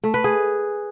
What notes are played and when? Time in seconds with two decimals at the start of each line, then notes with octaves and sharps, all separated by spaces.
0.03 A3
0.14 B4
0.24 G#4